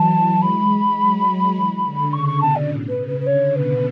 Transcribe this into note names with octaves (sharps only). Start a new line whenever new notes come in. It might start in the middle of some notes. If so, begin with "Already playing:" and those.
Already playing: E3 F#3 A5
G#3 B5
F#3
F#3
E3
D3
C#3 C#6
C#6
B2 A5
D5
A2
B4
C#3
B4
B4
D3 C#5
B2 B4